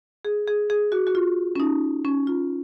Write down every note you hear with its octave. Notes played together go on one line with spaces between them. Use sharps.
G#4
G#4
G#4
F#4
F#4
F4
C#4
D#4
C#4
F4